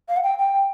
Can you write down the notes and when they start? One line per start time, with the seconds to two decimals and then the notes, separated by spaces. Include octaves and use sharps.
0.09 F5
0.17 F#5
0.23 G5
0.38 G5